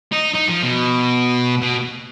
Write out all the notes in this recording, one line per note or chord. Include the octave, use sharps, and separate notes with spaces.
D#4
D#4
F3
B2
B2